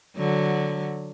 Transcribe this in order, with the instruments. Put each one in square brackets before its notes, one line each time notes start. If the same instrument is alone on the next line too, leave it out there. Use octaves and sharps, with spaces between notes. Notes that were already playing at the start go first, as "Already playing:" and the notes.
[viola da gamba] D3 F#3